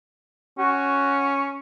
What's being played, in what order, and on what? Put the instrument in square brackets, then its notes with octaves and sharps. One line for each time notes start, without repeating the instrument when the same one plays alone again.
[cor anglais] C#4 [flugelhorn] F#4